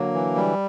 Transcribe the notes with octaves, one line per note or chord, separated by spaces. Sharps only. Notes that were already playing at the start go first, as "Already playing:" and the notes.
Already playing: D3 F#3 A#3
E3
G3